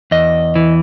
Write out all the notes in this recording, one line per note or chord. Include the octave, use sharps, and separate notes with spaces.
E2 D#5
E3